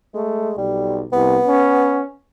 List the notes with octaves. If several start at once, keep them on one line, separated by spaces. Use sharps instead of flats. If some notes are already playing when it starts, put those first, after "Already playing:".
G#3 A3
B1 G3
C2 B3
C#4